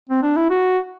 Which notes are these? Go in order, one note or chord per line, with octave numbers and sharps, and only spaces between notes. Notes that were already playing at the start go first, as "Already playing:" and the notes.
C4
D4
E4
F#4